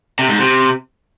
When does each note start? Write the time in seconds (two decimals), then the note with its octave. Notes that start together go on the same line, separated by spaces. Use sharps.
0.19 C3
0.29 G#2
0.39 C3